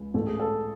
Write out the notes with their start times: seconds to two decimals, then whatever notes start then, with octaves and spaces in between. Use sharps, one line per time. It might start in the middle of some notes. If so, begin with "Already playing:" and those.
Already playing: C#2 G#3
0.14 A1 A4
0.27 G#4
0.40 A4